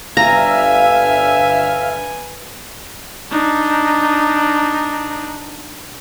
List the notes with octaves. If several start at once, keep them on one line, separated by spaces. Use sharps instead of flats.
G1 D4 B4 E5 F5 G#5 A#5
D4 D#4